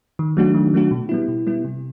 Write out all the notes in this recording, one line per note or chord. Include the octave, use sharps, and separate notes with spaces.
D#3
F#3 A3 D4 F#4
D#3
F#3 A3 D4 F#4
B2
G3 B3 E4
B2
G3 B3 E4
C3